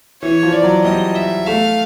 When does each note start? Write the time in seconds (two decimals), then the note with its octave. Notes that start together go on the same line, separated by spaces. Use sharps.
0.22 E3 C#5
0.43 F3
0.53 D5
0.63 F#3
0.85 G3 D#5
1.15 E5
1.47 A3 F5